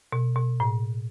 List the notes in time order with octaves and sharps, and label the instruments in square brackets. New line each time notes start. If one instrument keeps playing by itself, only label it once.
[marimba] B2
B2
A2